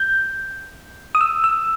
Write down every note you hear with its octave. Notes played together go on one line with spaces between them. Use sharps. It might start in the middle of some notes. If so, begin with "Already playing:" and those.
Already playing: G6
D#6
E6
E6